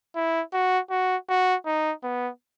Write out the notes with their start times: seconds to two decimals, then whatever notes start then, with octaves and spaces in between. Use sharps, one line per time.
0.15 E4
0.53 F#4
0.90 F#4
1.29 F#4
1.66 D#4
2.03 B3